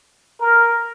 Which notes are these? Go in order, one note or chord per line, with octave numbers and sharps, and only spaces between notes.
A#4